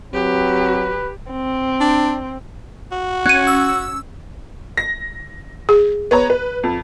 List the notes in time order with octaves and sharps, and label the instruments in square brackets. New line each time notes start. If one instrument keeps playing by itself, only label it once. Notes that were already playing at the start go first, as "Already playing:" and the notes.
[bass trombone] F#3 [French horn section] C4 [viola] G4 [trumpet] B4
[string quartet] C4
[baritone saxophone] D4
[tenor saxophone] F#4
[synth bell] C#4 [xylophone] F#6 D#7
[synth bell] E6
[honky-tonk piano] A#6
[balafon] G#4
[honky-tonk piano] B3 C#5 A#5
B4
F2